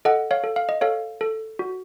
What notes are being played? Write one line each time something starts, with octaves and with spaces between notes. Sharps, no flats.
A4 D#5 F#5
C#5 F5
A4
F5
D#5
A4 C#5 F5
A4
F#4